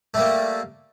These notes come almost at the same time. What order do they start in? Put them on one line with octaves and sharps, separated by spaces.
A3 G3 A#3